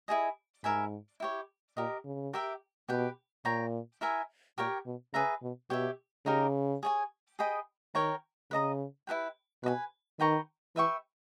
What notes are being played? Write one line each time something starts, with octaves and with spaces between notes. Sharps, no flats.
E4 G#4 D#5 G#5
G#2 A#4 E5 G#5 B5
E4 G4 C#5
A#2 G4 A#4 D#5
C#3
G4 A#4 E5 G5
B2 G4 B4 G5
A#2 C#5 G5 A#5
E4 A#4 E5 G#5
A#2 G4 A#4 C#5 G5
B2
C#3 G#4 B4 E5 A#5
B2
B2 G4 C#5 E5
C#3 D#4 G4 A#4
G#4 C#5 G#5
G#4 D#5 G5 B5
D#3 A#4 C#5 G5 A#5
C#3 B4 D#5 A#5 D#6
E4 G#4 B4 G5
B2 B4 D#5 G#5
D#3 B4 G5 A#5 C#6
E3 B4 E5 G5 C#6